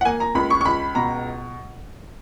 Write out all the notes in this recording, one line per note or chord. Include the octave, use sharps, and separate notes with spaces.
F#5
A#3 G#5
A#5
C#2 B5
C#6
C#6
C#2 B5
B2 A#5